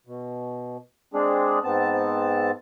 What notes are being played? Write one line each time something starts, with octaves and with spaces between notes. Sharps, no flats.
B2
G#3 C4 D4 G#4
G#2 B3 C4 A5